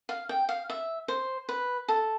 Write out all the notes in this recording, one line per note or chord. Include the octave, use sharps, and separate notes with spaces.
F5
G5
F5
E5
C5
B4
A4